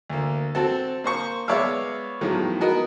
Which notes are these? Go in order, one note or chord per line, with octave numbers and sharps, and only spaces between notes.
D2 A#3
C4 F#4 A4 A5
A#3 C5 C#6
G#3 B3 C#5 D5 E5 F5
E2 A2 D#3 F3 F#3 G#3
B3 F#4 A#4 D#5